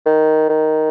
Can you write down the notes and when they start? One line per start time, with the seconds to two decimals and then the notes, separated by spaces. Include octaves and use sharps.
0.05 D#3
0.49 D#3